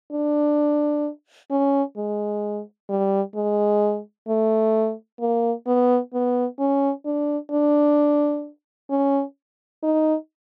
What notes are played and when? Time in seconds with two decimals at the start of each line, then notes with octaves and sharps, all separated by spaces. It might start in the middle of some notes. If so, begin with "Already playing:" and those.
0.12 D4
1.50 C#4
1.97 G#3
2.89 G3
3.35 G#3
4.28 A3
5.20 A#3
5.67 B3
6.13 B3
6.59 C#4
7.05 D4
7.51 D4
8.90 C#4
9.83 D#4